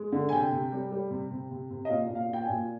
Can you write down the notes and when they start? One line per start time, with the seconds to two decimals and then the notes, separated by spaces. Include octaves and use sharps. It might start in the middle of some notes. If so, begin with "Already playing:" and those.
Already playing: G#3
0.12 D3
0.29 G#5
0.32 C3 G5
0.52 C3
0.72 G3
0.92 G3
1.11 C3
1.31 C3
1.51 C3
1.71 C3
1.85 D#5
1.89 A#2 F5
2.09 A#2
2.15 F5
2.28 A#2 G5
2.43 G#5
2.49 A#2